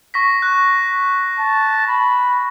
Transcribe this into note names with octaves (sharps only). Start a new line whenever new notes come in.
C#6 A#6 B6
F#6
A5
B5